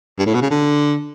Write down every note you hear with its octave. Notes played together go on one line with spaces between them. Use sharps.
G2
A2
B2
C#3
D3